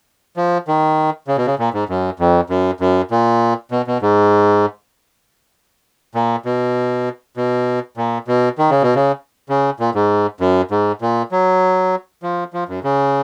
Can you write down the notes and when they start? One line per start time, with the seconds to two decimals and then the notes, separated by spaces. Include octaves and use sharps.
0.37 F3
0.68 D#3
1.28 C#3
1.37 B2
1.47 C#3
1.59 A#2
1.74 G#2
1.89 F#2
2.19 F2
2.50 F#2
2.80 F#2
3.11 A#2
3.71 B2
3.87 B2
4.02 G#2
6.15 A#2
6.45 B2
7.37 B2
7.97 A#2
8.28 B2
8.58 D#3
8.70 C#3
8.82 B2
8.95 C#3
9.49 C#3
9.80 A#2
9.95 G#2
10.40 F#2
10.71 G#2
11.01 A#2
11.32 F#3
12.23 F3
12.53 F3
12.69 F#2
12.84 C#3